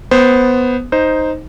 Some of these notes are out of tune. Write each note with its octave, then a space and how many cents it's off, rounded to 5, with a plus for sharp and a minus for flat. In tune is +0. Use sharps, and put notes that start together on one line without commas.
B3 +0 C5 +0
D#4 +0 C5 +0